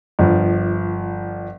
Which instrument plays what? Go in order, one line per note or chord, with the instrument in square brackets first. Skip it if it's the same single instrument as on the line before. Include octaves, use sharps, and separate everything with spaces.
[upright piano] G1 F3